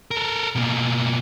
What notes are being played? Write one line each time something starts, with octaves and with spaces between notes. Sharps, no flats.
A4 A#4
B2 A#3